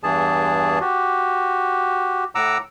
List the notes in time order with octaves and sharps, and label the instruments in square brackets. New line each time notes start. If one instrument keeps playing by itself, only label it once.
[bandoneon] E2 G2 E3 G#4 A5
F#4 G4
A2 F#5 A#5 D6 E6